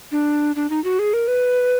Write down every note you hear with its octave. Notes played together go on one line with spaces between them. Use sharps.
D4
D4
D#4
F#4
G#4
A#4
B4